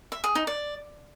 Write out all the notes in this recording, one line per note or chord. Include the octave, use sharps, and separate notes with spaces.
E5
G#4
D#4
D5